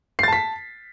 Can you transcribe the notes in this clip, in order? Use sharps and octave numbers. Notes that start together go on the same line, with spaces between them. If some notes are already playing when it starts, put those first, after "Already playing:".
A5 A6 B6 C7